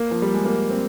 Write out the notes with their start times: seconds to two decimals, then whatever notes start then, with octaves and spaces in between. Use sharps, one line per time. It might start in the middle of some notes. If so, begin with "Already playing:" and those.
Already playing: A#3
0.11 F3
0.22 G3
0.34 G#3
0.45 A#3
0.70 C4